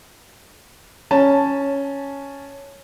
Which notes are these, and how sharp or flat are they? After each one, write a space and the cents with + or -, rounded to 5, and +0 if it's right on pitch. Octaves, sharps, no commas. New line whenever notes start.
C#4 +0 A5 +0